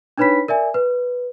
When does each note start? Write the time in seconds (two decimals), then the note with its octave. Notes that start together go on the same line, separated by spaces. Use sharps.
0.18 D4 D#4 B4 C#5 B5 B6
0.48 A#4 D5 E5 G#5
0.74 B4